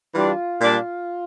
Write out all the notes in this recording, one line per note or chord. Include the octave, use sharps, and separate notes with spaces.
E3 G3 D4 F4
A#2 G3 D4